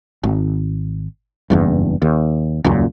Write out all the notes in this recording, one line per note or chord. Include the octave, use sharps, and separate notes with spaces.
G#1
F#1 E2 G2
D#2
D#1 C#2 F#2 A#2